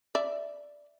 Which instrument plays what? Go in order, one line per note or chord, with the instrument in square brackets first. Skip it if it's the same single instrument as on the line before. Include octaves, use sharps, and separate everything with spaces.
[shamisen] D5 E5